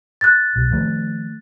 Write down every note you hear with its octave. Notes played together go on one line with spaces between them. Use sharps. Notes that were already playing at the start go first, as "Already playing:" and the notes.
F#6 A6
B1
D#3 F3 A3